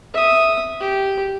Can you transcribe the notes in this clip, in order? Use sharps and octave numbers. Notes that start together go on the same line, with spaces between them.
E5 D#6
G4